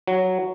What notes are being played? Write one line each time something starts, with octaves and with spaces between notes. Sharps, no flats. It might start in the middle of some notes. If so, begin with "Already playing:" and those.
F#3